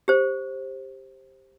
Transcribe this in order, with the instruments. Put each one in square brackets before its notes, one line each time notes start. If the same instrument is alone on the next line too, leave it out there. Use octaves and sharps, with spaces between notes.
[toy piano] G4 C5